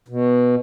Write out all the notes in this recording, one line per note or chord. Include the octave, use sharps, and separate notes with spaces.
B2